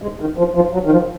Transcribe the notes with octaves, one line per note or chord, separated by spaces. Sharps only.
G#3
D#3
F3
F3
F#3
D#3
F3